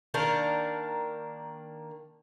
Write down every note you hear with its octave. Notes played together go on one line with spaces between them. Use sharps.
D#3 A#3 D4 A#4